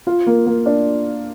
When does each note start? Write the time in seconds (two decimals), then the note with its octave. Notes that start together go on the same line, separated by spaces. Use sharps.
0.07 F4
0.27 A#3
0.46 A#3
0.66 D4